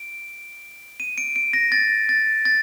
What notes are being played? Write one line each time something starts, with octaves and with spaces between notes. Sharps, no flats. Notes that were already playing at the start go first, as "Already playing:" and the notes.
Already playing: D7
D#7
D7
D7
A#6
A6
A6
A6